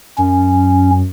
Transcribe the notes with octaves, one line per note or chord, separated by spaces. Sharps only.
F#2 C#4